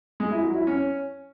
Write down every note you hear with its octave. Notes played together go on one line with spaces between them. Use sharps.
G#3
E4
F#3
E4
C#4